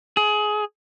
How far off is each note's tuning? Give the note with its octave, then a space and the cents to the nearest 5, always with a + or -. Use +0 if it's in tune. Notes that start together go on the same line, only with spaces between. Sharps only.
G#4 +20